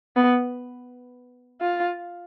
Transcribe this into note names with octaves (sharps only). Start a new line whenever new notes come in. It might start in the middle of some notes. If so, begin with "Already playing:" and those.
B3
F4